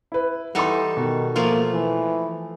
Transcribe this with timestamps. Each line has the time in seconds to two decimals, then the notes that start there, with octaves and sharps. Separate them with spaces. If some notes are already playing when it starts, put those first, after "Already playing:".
0.12 E4 B4
0.55 E3 G3 D#4 A4 F#5 C6
0.97 B2 D#3
1.36 F3 A3 A#3 F4
1.74 E3